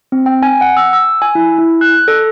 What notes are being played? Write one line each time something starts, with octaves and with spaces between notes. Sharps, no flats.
C4
G5
G#5
F#5
E6
E6
G#5
E4
E4
F#6
A4